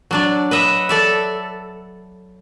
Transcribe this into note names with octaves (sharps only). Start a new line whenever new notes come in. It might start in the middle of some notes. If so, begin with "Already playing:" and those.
F#3 D4 D5
B4 D#5 E5 F#5
A4 D5 E5